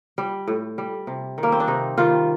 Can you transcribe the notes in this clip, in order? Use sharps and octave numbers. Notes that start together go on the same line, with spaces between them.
G3
A2
G3
C3
D#3
G3 A#3
C4
D4
C3 D#4
D#3 G3 F4